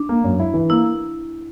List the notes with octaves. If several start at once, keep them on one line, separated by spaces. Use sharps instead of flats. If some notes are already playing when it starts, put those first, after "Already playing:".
Already playing: D4
A#3
F#2
E4
E3
A#3 E4